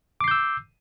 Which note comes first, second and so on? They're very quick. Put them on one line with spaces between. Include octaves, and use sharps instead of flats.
D6 C7 G6 E6